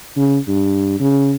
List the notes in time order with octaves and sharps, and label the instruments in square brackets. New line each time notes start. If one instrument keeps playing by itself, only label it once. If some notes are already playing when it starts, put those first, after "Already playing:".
[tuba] C#3
G2
C#3